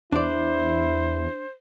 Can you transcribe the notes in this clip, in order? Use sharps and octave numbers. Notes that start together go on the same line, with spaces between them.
E2 D4 E4 C5 D5